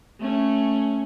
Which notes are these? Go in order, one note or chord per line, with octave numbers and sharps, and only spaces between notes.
A3 C#4